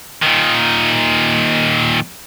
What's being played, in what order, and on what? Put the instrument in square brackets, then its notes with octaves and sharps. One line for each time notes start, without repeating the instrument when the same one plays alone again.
[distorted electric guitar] A#2 D#3